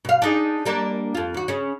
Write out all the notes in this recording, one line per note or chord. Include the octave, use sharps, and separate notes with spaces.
B2 F5
D4 D#4 G#4
G3 A#3 D4
F2 F4
D#2 F#4
C#3 C#4